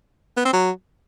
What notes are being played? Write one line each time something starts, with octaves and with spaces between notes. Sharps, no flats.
B3
C4
F#3